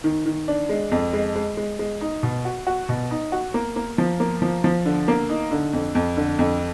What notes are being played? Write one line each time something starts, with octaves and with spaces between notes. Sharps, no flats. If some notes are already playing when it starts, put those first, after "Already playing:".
D#3
D#3
D4
G#3
F2
G#3
G#3
G#3
G#3
D#4
B2
F#4
F#4
B2
D#4
F#4
A#3
A#3
F3
A#3
F3
F3
D3
A#3
D#4
D3
F2
F2
D3
F2